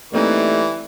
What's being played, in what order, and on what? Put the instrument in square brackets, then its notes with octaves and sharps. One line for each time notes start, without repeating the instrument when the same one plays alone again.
[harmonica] E3 [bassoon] G3 [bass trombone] A3 [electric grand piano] A#3 C4 D#4